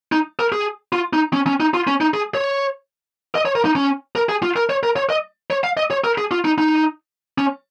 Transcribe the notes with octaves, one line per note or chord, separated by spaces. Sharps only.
D#4
A#4
G#4
F4
D#4
C#4
C#4
D#4
F4
C#4
D#4
G#4
C#5
D#5
C#5
A#4
D#4
C#4
A#4
G#4
F4
A#4
C#5
A#4
C#5
D#5
C#5
F5
D#5
C#5
A#4
G#4
F4
D#4
D#4
C#4